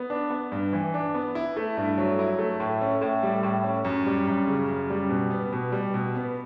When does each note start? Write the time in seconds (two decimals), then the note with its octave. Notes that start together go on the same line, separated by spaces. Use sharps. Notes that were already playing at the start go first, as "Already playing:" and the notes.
Already playing: B3
0.10 D4
0.30 B3
0.52 G2
0.73 E3
0.94 D4
1.14 B3
1.35 E4
1.56 A3
1.77 G2
1.98 F#3
2.19 E4
2.39 A3
2.60 A2
2.81 C#4
3.02 A2
3.23 G3
3.43 A2
3.64 C#4
3.85 F#2
4.06 G3
4.27 F#2
4.47 C#3
4.68 F#2
4.90 G3
5.10 B2
5.30 B3
5.52 B2
5.72 G3
5.94 B2
6.15 B3